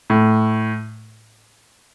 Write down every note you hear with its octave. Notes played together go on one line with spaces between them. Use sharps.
A2